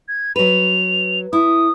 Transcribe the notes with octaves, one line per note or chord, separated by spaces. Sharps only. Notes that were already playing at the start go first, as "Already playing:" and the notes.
G#6
F#3 B4 F7
E4 D#6